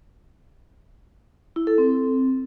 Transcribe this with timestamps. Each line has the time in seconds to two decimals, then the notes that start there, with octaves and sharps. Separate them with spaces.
1.56 E4
1.67 A4
1.78 C4